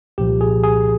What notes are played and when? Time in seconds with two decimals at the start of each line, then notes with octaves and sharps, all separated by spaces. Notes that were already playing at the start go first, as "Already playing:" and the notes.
0.18 C2 A#2 F3 G4
0.41 G#4
0.64 G#4